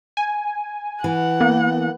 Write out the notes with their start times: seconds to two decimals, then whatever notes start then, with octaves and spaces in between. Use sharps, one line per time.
0.17 G#5
1.04 E3 F#5
1.40 A#3 B3